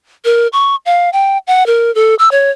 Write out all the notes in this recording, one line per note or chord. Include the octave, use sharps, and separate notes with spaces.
A#4
C#6
F5
G5
F#5
A#4
A4
E6
C#5